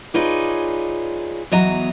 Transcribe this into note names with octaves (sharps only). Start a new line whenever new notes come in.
D#4 F4 G#4 B4 C#5 D5
E2 F#3 D#5 A#5